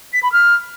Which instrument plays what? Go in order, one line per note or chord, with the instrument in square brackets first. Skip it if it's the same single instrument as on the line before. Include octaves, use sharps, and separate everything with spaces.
[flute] B6
B5
F6